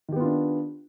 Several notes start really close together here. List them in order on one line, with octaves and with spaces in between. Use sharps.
D#3 G4 B3 F4 D4